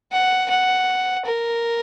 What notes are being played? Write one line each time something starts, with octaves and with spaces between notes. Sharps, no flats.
F#5
F#5
A#4